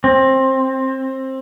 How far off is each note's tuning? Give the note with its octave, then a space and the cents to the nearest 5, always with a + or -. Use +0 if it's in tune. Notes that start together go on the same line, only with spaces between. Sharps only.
C4 +20